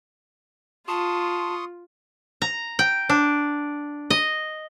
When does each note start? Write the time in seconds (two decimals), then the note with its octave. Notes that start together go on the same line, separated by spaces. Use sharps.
0.88 F4 A5 C6 C#6 D#6
2.42 A#5
2.79 G5
3.09 D4
4.10 D#5